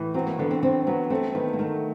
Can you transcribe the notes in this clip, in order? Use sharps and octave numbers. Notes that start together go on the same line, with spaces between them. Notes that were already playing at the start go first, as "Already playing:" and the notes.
Already playing: A2 E3
F#3 C4
A#3
D3 B3
C4
D3 C4
F#3 B3
A3 C4
D#3 B3
A#3
D#3 A3